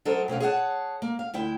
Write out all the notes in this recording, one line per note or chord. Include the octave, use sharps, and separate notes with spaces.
F#3 A4 A#4 C5 D#5
B2 C4 C#4 F5
G#4 C#5 D#5 F5 F#5 A5
A#3
F5
D2 E4 G5